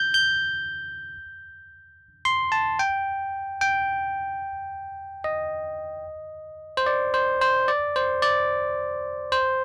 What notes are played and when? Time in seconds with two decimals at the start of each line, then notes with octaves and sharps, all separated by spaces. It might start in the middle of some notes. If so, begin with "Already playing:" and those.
Already playing: G6
0.14 G6
2.25 C6
2.52 A5
2.79 G5
3.61 G5
5.24 D#5
6.77 C5
6.86 D5
7.14 C5
7.41 C5
7.68 D5
7.96 C5
8.22 D5
9.32 C5